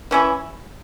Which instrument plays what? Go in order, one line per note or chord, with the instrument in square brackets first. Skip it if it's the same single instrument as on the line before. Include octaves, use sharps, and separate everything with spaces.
[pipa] E3 C#4 E4